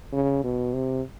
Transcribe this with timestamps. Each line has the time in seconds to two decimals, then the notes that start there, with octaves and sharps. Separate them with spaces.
0.13 C#3
0.44 B2
0.74 C3